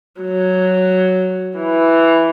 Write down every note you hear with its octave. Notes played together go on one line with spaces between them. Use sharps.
F#3
E3